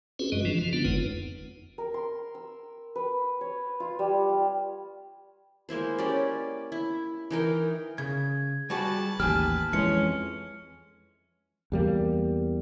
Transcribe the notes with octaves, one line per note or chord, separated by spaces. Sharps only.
C4 C#4 F4 F#4 G#4 B4
F#2 G3 G#3 D#5
E3 F3 D4
F3 F4
D3 B3 C4 D4 F4
F#1 F2 G#3 D#4 B4
A#4
C6
E6
B4
C#5
F4
G3
F4
G#3 A#3 E4 C5
C#4 G4 D5
E4
E3 D#4 A#4 G5
C#3 G#6
G3 F#4 G#4 B4 A5
A1 D#2 G4 G#5 F6
F2 E3 G#3 C#4 C#7
E2 G3 A#3